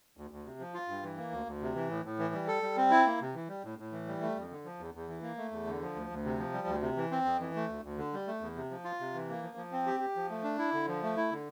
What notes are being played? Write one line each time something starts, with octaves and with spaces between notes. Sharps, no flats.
D2
D2
C3
F3
F4
G2
E3
A#3
D2
D2
C3
E3
A2
A2
E3
G3
A4
G3
C4
E4
A#3
C3
E3
G3
A2
A2
E3
G3
A3
F2
D3
F3
E2
E2
E3
A#3
A3
E2
D3
F3
D2
D2
C3
F3
G3
D2
C3
E3
C4
F2
E3
A3
D2
D2
D3
G3
A3
E2
C3
F3
F4
C3
E3
A#3
F3
F3
C4
G4
G4
F3
A3
D4
E4
D3
F3
A3
E4
D3